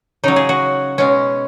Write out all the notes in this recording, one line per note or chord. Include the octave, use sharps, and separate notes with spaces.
C#3 F#3 D#4
G#4
F#4
B2 G#3 C#4